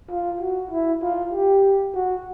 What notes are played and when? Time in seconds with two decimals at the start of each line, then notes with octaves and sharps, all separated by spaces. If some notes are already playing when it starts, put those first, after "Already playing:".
0.10 F4
0.41 F#4
0.71 E4
1.03 F4
1.33 G4
1.94 F#4